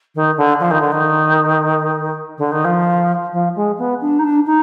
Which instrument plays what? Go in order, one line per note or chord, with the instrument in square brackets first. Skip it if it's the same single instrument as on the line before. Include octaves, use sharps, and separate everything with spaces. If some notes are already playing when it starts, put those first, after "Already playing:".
[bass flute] D#3
D3
F3
D#3
D3
D#3
D3
D#3
F3
F3
G#3
B3
D4
D#4
D4
D#4